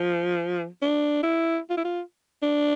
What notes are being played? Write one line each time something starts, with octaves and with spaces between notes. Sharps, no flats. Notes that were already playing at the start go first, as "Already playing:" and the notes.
Already playing: F3
D4
E4
F4
E4
F4
D4